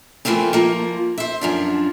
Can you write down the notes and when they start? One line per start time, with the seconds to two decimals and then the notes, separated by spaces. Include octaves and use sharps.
0.25 E3 F3 A3 A#3 C4
0.53 F3 A#3
1.18 C5 E5
1.41 F#2 F3 D4